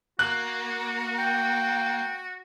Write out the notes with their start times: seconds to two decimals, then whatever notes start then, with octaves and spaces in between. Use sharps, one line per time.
0.19 A#3 F#4 F#6
1.18 G5